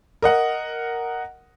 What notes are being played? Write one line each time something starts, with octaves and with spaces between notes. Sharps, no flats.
A#4 D#5 F#5